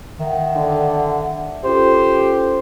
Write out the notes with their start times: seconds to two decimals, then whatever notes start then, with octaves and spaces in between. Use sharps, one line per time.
0.20 D#3 E5 F#5
0.56 D3
1.64 C#4 F4 G4 A4 C5